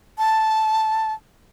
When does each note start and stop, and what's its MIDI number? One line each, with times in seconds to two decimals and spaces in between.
0.18 1.13 81